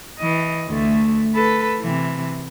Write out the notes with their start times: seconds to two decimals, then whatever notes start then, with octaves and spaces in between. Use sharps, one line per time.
0.18 E3 D#5
0.69 D2 A3
1.34 A4 B4
1.81 C3 E3